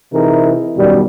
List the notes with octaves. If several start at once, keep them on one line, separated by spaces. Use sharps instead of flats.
C3 E3 D#4 E4 G#4 A#4
F#2 B2 D#3 G3